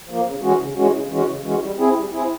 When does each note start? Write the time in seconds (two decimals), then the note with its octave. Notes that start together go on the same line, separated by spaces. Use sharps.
0.09 F3 A#3
0.25 C#3
0.42 E3 G#3 C#4 F#4
0.59 C#3
0.76 E3 G#3 C#4 F#4
0.94 C#3
1.10 E3 G#3 C#4 F#4
1.27 C#3
1.44 E3 G#3 C#4 F#4
1.62 G3
1.78 C4 E4 G#4
1.96 G3
2.12 C4 E4 G#4